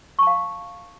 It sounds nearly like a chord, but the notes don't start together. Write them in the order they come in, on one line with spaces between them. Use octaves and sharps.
C#6 A5 F5